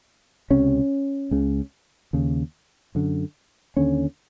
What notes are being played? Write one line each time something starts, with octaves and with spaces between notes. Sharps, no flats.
C#2 C3 C#4
C#2 C#3
D#2 C#3
F#2 D3
D#2 D3 C#4